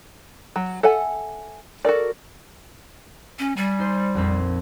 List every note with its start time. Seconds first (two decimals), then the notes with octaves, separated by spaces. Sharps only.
0.56 F#3
0.83 A4 E5 F#5 G#5
1.85 F#4 A4 A#4 D5
3.39 C#4
3.57 G3 G#5 B6
3.79 D#4 C5 C6
4.14 A#1 F2 C4